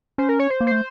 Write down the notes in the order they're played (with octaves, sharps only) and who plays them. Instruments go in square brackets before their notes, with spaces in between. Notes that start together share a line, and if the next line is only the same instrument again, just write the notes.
[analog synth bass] C#4 [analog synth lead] C5
[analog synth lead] A#4
C#5
C5
[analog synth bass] A#3
[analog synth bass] A3 [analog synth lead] C5